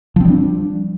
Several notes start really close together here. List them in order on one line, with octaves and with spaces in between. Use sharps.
F3 C4 G3 D4